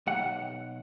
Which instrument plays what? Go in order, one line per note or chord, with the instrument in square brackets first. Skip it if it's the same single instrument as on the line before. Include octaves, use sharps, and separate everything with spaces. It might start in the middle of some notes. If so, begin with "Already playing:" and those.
[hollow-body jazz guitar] B1 F#5